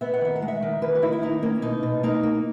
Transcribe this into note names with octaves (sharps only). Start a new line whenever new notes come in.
B3 E5
F#5
D#3 E5
F#5
G#3
E5
D#3
D#3 B4
F#4
D#3 E4
E4
A#3 D#4
A#3 C#4
B2 D#4
B2
A#3 D#4
A#3